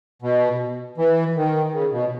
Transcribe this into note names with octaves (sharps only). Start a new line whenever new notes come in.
B2
E3
D#3
C#3
B2